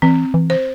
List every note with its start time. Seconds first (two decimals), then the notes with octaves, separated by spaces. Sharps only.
0.02 E3 C4
0.34 E3
0.50 C5